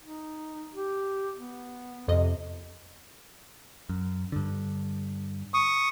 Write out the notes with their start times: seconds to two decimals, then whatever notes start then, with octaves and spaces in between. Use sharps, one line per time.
0.01 D#4
0.75 G4
1.36 B3
2.08 F2 C3 D#5
3.89 F#2
4.32 G2 D3
5.54 C#6 D#6